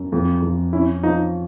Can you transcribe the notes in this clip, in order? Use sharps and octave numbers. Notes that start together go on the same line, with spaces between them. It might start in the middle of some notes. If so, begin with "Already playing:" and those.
Already playing: F#2
F2
F2
C#4 E4
F3 D#4